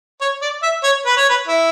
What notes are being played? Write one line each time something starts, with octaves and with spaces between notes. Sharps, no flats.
C#5
D5
E5
C#5
B4
C#5
B4
E4